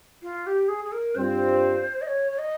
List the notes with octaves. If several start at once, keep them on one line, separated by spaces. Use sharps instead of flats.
F4
G4
G#4
G#4
A#4
G2 G3 C4 F4 C5
D#5
C#5
C#5
D#5